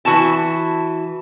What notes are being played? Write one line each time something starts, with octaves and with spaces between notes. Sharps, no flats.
E3 F#4 A5